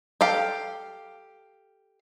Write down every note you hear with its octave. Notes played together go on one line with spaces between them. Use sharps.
G4 A4 F5